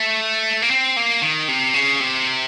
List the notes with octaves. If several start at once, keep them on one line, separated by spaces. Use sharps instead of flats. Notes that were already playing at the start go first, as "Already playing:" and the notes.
Already playing: A3
A#3
C4
A#3
D#3
C3
C#3
C3